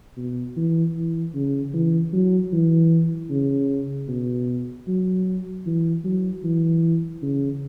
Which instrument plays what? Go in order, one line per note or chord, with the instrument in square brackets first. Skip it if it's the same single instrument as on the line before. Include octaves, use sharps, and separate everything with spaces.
[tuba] B2
E3
E3
C#3
E3
F#3
E3
C#3
B2
F#3
E3
F#3
E3
C#3